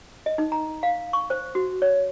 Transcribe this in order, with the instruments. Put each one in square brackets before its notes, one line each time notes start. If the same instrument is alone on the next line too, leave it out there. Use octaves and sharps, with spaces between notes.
[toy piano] D#5
D#4
A#5
F5
C#6
C5
F#4
C#5